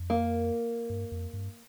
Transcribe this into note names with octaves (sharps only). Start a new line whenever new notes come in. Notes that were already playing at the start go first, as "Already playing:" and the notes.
Already playing: F2
A#3
G2
F2
G2